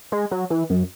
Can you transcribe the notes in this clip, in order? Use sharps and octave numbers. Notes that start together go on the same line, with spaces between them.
G#3
F#3
E3
F#2